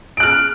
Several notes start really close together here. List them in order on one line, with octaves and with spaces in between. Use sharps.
D7 F#6 F6